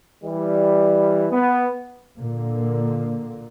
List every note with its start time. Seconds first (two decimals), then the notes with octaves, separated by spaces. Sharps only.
0.23 E3 G3
1.32 B3
2.17 A#2 D3 A#3